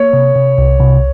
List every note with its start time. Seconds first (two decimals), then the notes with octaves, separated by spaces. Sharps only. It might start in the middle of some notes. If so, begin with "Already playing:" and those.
Already playing: A#3 C#5
0.13 C3
0.36 C3
0.58 C2
0.80 C3